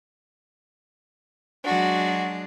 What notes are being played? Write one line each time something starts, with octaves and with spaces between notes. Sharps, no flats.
F#3 G#3 D4 F#4